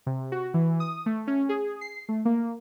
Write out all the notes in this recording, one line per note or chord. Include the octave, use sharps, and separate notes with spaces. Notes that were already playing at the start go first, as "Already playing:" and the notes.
C3
F#4
E3
D#6
A3
C#4
G#4
C7
A3
A#3